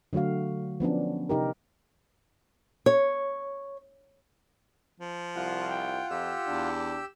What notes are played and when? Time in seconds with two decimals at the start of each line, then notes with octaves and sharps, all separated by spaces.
0.13 D3 F#3 A3 F#4 F5
0.80 F3 B3 C#4 D4
1.29 C3 D#4 G4 A#4
2.86 C#5
5.00 F3
5.36 C2 F4 F#5
5.70 G5
6.10 F2 G4 E6
6.47 E2 D4